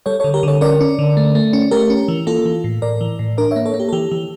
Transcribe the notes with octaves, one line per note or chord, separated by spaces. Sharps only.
G3 A4 C#5
D3 A4 C#5
G4 A#4
D3 A4 C#5
C#4 A#4 D5
C#4
D3
A3
A3
C#4
A3 G4 A#4
C#4
E3
A#3 F4 A4
E3
A2
A2 A#4 D5
E3
A2
D4 A#4 D5
A#3 C#5 E5
A4 C#5
A#3
G4
A4
E3 G4
E3